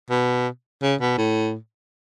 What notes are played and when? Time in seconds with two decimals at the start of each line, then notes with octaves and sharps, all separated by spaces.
0.10 B2
0.82 C#3
1.00 B2
1.18 A2